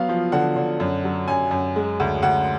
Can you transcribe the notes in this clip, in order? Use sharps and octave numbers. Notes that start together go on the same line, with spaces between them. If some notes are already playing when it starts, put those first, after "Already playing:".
Already playing: F#3 B3 F5
F3
D3 F#5
D3
F#2
F#3
F#2 G#5
F#2
G#3
D2
D2 F#5